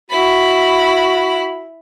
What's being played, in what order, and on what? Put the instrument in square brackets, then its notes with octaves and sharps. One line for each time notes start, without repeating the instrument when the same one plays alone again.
[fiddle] E4 B5 [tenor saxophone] F#4